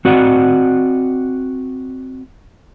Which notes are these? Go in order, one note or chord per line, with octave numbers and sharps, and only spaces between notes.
C4 F#4 D5 D#5 F#5